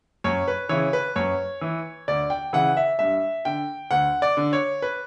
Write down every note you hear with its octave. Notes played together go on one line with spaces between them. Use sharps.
F#2 C#5
B4
C#3 E3 C#5
B4
F#2 C#5
E3
D2 D5
G5
C#3 E3 F#5
E5
G2 E5
D3 G5
D2 F#5
D5
D3
C#5
B4